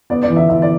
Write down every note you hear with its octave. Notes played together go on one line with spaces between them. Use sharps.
B3 D5
D5
E3
E5
E3 E5
D5